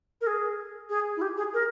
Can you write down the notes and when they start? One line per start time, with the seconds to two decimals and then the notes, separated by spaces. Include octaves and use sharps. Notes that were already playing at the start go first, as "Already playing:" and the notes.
0.21 A#4
0.27 G#4
0.90 G#4
1.17 E4
1.22 G4
1.37 G#4
1.54 A#4